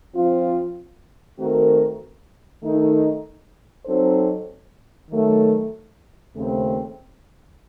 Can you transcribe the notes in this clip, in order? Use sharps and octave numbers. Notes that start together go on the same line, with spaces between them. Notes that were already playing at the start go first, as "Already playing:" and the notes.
F3 C4 F4
D#3 A3 C4 F#4 A#4
D#3 A3 D#4
F#3 C4 D#4 A4 C5
D#3 F#3 A3
D#2 C#3 A3 C4